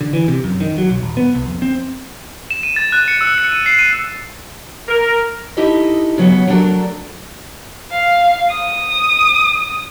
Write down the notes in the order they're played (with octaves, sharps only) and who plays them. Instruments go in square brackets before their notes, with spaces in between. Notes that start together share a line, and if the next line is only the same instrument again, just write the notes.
[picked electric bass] D3
E3
C3
F#2
D#3
F#3
B1
D#1
B3
C2
F2
C4
[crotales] E7
D#7
A6
F#6
C#7
E6
C#7
D#7
C7
D#7
[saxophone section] A#4
[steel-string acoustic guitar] D#4 E4 G4 A4 D#5 E5
C#3 F#3 B3 C#4
F#3 A3 B3 D4 A4 A#4
[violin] F5
D#6